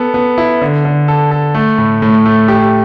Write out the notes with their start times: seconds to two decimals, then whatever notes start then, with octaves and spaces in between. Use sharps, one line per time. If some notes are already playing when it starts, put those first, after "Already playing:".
Already playing: B3 A4
0.14 B3
0.38 E4
0.62 D3
0.85 D3
1.08 A4
1.31 A4
1.55 A3
1.78 A2
2.02 A2
2.26 A3
2.48 G4